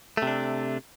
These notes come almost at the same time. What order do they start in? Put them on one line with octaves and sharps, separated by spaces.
A3 C3 D4